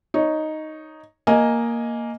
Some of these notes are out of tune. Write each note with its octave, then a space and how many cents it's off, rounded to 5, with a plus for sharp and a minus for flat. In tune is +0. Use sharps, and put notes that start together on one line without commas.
D#4 +0 C#5 +0
A#3 +0 D#5 +0 G#5 +5